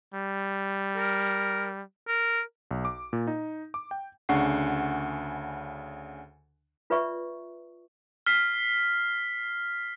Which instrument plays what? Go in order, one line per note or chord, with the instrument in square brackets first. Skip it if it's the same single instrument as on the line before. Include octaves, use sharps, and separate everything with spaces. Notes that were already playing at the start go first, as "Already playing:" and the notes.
[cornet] G3
[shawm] A#4
A#4
[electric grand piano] B1
D6
A#2
D#4
D6
G5
D2 C#3 D4 F#5 C#6 C7
[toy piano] F4 B4 D5 E5 C#6
[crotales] F6 B6 C7